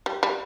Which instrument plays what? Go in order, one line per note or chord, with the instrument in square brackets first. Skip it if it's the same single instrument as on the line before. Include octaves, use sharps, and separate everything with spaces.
[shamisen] G3
G3